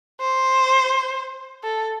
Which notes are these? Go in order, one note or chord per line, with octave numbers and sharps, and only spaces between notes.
C5
A4